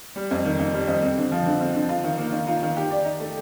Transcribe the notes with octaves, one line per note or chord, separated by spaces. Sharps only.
G3
F2
D#3
F2
G3
F2
C4
D3
F3
D3
C4
D3
F4
D#3
A#3
D#3
F4
D#3
G4
D5
D#4
A3